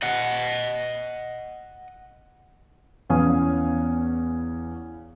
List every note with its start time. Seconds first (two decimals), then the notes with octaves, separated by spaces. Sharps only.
0.02 D#5 F#5
3.10 E2 B3 C#4 F5 G#5 D#6